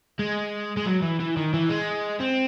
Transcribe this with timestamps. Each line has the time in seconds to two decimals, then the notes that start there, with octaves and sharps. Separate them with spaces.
0.19 G#3
0.77 G#3
0.86 F#3
1.02 E3
1.20 E3
1.37 D#3
1.54 E3
1.70 G#3
2.20 C4